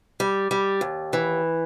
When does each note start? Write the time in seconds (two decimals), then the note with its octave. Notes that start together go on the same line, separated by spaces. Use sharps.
0.20 G3
0.51 G3
0.81 D#2
1.13 E3